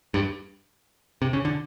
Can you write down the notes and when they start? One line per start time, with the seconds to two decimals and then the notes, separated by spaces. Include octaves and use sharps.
0.14 G2
1.22 C3
1.33 C#3
1.45 D3